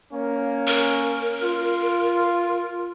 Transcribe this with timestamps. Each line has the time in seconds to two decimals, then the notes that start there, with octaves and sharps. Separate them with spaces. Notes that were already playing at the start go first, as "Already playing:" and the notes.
0.13 A#3 C#4
0.67 A#4
1.43 F4